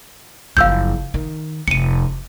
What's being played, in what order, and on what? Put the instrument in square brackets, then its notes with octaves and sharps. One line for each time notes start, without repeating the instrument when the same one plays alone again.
[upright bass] F#1 F3 [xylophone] F5 E6 G6
[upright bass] D#3
[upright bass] F1 [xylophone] C#7 D#7